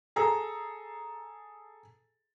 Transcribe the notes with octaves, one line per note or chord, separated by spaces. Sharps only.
G#4 A4 A#5